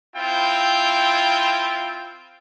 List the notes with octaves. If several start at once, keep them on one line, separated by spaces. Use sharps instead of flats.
C4 E4 F4 G5